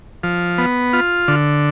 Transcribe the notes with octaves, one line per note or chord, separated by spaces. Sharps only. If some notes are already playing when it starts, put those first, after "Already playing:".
F3
B3
F4
D3